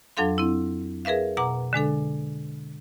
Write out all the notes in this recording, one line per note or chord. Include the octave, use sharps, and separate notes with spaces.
F2 F#3 D4 A4 F5 C6
C4 E4
G#4 A#4 B4 E5 F5
B2 F#5 A#5 D6
D3 G#3 D4 A4